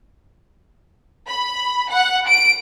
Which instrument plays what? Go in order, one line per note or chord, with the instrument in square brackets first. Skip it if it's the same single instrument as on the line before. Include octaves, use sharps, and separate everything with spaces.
[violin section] B5
F#5
D7